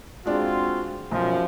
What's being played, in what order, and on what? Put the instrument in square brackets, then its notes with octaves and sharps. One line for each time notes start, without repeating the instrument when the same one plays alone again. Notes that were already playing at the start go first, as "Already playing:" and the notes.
[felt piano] G#3 D4 [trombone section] C4 F4 F#4
[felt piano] B1 [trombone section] F#2 F3